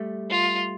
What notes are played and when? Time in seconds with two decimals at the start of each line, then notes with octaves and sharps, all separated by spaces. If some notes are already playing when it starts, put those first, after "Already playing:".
Already playing: G3 A3
0.30 F4